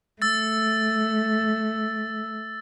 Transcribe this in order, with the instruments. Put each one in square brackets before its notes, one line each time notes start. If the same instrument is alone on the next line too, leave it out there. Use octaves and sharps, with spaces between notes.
[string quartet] A3 [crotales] E6 A6